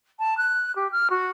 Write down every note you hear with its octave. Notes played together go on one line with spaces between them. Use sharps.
A5
F#6
G4
F6
F#4